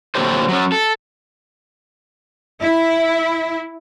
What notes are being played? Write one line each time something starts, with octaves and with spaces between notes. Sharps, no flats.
A#2 D3 E3 F#3 G4 C5
F#3 C#4
A4
E4